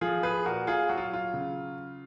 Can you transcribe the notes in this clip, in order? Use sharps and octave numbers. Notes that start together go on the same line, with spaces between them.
F3 F4 G#4
G#4 B4
A#2 F#4 A#4
F4 G#4
F#3 F#4
F4
F4
C#3